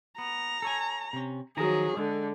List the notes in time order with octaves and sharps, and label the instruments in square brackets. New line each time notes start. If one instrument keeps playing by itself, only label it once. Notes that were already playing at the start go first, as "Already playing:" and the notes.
[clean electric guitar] B3 [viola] A#5
[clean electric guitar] A4 C#5 G#5
C3 C#4
[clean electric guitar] D#3 F3 A#5 [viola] F#3 G#4
[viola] D3 [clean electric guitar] G#3